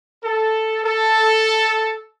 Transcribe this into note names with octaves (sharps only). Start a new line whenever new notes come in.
A4
A4